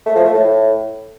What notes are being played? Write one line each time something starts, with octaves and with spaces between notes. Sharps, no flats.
A3
F3
A3
A2